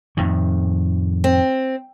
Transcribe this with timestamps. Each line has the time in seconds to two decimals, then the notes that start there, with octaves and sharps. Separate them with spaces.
0.17 F2 A2 D#3
1.24 C4